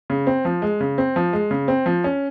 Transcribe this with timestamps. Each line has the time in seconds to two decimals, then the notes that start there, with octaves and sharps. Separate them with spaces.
0.10 C#3
0.27 C4
0.45 F3
0.62 G#3
0.80 C#3
0.98 C4
1.16 F3
1.33 G#3
1.51 C#3
1.68 C4
1.86 F3
2.04 C#4